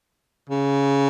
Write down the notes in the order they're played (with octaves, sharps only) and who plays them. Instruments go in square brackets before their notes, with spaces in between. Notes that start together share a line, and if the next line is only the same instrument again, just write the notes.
[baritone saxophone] C#3